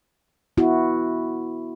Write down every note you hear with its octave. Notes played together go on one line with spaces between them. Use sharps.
B3 E4 F#4